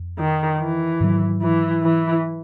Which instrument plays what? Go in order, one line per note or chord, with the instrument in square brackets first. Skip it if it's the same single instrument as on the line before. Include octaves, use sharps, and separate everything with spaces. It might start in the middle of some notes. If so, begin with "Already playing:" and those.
Already playing: [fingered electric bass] F2
[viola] D#3
E3
[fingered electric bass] G#2 D#3 F#3
[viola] E3
E3